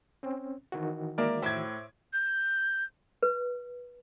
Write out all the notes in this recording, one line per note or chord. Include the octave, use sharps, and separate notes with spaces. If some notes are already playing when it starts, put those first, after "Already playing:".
C4 C#4
D#3 E3 F#4
G#3 A#3 A#4 D5 E5
A2 C5 E5 D6 G#6
G6
B4